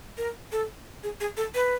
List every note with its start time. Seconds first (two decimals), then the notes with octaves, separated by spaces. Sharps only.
0.18 A#4
0.52 A4
1.03 G#4
1.20 G#4
1.37 A4
1.54 B4